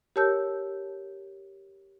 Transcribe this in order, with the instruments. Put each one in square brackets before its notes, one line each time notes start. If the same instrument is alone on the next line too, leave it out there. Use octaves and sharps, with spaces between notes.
[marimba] G4 A#4 C#5 A5 E6 G6